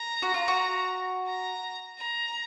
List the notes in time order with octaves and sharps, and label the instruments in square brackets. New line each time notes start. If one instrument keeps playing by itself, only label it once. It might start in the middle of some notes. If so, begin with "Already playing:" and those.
Already playing: [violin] A#5
[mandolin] F#4
F4
F#4
[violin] A#5
A#5